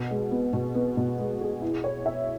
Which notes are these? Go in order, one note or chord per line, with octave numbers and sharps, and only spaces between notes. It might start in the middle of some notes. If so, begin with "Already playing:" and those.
Already playing: B2
G#3
B3
B2
B3
B2
G#3
G#4
E4
C#5
E5